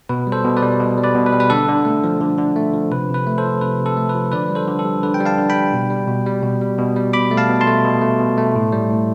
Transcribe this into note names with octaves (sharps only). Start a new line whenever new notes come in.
B2 B4
G3
A4 C5
B2
B4 D5
G3
B2
G3
B4 D5
B2
B4
G3
B4
D3 A4
D3
A3
F3
D3
D3
A3
F3
C3 B4
C3
B4
A3
A4 C5
F3
C3 B4
C3
A4
A3
F3 B4
D3 B4 D5
G3
A4 C5
D3
A4
G3
D3 B4
G5
G3
F5 A5
D3
G5 B5
G3
B2
G3
B2
G3
B2
G3
B2
G3
B2 B5 D6
A3
F5 A5
B2
A5 C6
A3
B2
A3
B2
A3
A2
G3
A2